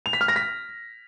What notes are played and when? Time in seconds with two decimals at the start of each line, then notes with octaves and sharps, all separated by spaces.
0.06 F7
0.13 B6
0.21 F6
0.28 A#6
0.36 B6